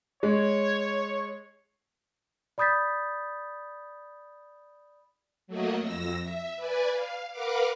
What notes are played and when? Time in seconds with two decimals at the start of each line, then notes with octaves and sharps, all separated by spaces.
0.23 G#3 C#5
2.58 D5 B5 D#6 G6 A6 B6
5.47 F#3 A3 A#3 F#4 D#5
5.80 F2 E6 A#6
6.22 E5
6.56 B4 D5 G#5
6.90 F5
7.31 A#4 B4 F5 F#5 D6